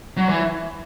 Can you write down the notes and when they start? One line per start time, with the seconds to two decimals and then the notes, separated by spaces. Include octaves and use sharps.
0.17 F#3
0.29 E3